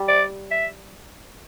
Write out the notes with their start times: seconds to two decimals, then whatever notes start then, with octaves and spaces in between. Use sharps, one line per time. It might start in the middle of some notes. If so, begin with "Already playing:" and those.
Already playing: G3
0.08 D5
0.51 E5